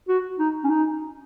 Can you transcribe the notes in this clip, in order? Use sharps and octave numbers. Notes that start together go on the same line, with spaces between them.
F#4
D#4
C#4
D#4